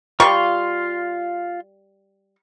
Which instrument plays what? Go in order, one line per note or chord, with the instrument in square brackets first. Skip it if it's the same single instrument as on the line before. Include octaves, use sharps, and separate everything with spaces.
[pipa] G3 C#6 [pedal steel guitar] F4 F5 C6